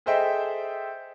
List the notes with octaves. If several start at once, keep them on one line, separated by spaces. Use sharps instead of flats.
G#4 A4 C5 D#5 E5 G5